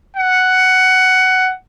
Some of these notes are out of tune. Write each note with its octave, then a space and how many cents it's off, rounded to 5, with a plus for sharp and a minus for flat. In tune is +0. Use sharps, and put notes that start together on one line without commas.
F#5 +10